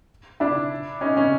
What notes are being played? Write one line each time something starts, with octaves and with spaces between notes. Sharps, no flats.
D4 E4
C#4 D#4
C#4 D#4